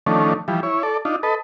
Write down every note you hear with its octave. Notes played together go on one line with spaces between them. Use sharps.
D#3 F3 A3 C#4 D4
E3 F3 G3
E4 C#5
A4 D5
D4 D#4 F4
A4 B4 D#5